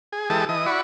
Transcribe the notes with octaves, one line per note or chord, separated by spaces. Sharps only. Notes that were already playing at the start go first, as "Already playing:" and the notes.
G#4
E3 G#3 G4 A4 A5 D#6
E3 D#5 D#6
E4 F#4 D5 B5 C#6